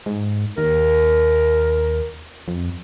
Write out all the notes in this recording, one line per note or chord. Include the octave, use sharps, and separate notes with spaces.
G#2
D#2 A#4
F2